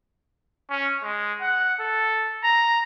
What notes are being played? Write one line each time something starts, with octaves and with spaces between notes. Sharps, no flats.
C#4
G#3
F#5
A4
A#5